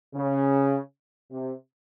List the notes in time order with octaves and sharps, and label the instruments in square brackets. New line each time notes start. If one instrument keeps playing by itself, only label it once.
[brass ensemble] C#3
C3